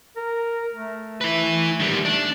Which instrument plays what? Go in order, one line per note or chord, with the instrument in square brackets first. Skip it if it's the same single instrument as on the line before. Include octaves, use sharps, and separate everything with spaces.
[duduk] A#4
A3
[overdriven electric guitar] E4 B4
D#3 G3
[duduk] A3 [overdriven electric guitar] D4